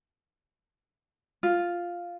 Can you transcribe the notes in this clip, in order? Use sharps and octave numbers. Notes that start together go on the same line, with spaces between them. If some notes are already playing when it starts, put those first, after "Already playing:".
F4